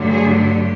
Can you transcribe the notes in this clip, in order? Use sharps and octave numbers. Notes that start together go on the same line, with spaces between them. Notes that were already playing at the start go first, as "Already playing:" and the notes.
Already playing: G2 D3 F#3 A3
G#4
G4